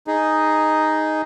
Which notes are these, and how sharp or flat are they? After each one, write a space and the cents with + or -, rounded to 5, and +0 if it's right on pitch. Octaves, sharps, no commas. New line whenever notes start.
D#4 +0 G#4 +0